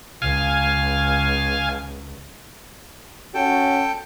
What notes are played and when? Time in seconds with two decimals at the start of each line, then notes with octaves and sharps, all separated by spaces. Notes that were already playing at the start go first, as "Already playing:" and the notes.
0.22 C#2 F5 G#5
3.34 C#4 F#4 A4 G5